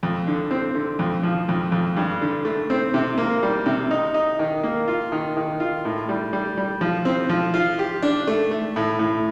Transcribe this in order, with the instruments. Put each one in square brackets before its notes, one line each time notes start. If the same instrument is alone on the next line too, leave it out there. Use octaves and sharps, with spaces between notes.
[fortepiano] F2
D3
C4
D3
F2
F3
F2
F2
G2
D3
A3
C4
C3
A#3
G3
C3
D#4
D#4
D#3
A#3
F4
D#3
D#3
F4
A2
G3
G3
G3
F3
C4
F3
F4
G4
D4
A3
A3
A2
A2